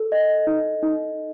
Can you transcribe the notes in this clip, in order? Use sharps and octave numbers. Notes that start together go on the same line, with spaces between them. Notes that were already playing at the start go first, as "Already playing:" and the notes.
Already playing: A4
D#5
D#4
D#4